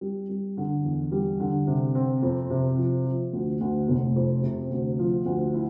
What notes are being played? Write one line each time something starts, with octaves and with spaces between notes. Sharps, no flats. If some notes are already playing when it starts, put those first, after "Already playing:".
G3
G3
D3
E2
G3
D3
C3
C4
F2
C3
F3
F3
D2
D2
F1
F2
C3
D2
F3
D2
E4